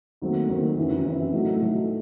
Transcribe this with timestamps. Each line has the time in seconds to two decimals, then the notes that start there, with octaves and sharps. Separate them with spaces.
0.22 D#2 D#3 F#3 A3 C4
0.48 D#2 D#3 F#3 A3 C4
0.78 F#2 E3 C4 E4
1.05 F#2 E3 C4 E4
1.33 A2 F#3 A3 D#4
1.61 A2 F#3 A3 D#4